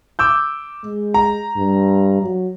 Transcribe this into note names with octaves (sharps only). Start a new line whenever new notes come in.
D6 E6 G6
G#3
A#5
G2
F#3